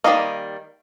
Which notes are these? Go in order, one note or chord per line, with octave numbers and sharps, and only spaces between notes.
D#3 G3 A#3 D#5 F5